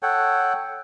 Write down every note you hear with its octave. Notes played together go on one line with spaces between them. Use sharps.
A4 C#5 F#5 G5